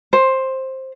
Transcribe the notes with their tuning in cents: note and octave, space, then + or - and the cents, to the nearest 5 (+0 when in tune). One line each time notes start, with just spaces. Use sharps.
C5 +10